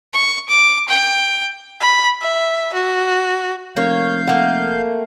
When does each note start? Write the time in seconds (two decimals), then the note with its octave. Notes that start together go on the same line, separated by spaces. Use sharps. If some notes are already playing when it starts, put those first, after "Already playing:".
0.13 C#6
0.48 D6
0.88 G5
1.80 B5
2.21 E5
2.73 F#4
3.76 F1 A#3 C#5 F5 G6
4.27 A3 A#3 F#5